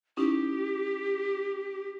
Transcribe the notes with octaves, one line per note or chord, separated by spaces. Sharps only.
C#4 D#4 E4 G4